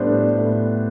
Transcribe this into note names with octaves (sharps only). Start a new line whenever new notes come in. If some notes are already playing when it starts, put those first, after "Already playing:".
Already playing: A2 G3 B3 D4 B4 C5
A2